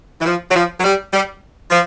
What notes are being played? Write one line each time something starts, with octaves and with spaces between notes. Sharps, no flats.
E3
F3
F#3
F3
F#3
G3
G3
F3